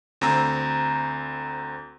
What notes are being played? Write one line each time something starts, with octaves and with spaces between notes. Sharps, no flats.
D2 C4 A#5 E6